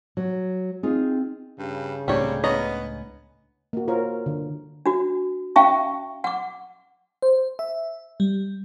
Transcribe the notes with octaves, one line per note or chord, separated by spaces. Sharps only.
F#3
C4 D#4 F4 G#4
G2 C#3
C#2 A2 C3 G3 D4 C#5
B3 C#4 D#5 A#5
A#3 F#4
F4 A#4 C5 C#5
D3
D4 F#4
C#4 E5 F5 G5 A5 C#6
F#5 D6
C5
E5
G3